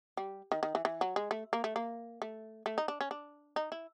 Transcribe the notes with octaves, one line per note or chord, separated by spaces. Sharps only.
G3
D#3
D#3
E3
E3
F#3
G#3
A3
A#3
A3
A#3
A3
A3
D#4
D4
C#4
D4
D#4
E4